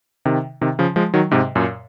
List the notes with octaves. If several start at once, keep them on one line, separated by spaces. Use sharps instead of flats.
C3 D#3
C3 D#3
C#3 F3
F3 G#3
D#3 F#3
G#2 C3
F#2 A#2